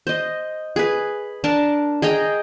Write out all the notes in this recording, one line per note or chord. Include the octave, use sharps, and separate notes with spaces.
C5 D#5
G#4 B4
D4 A#4 A5
G#4 D#5 G5 A#5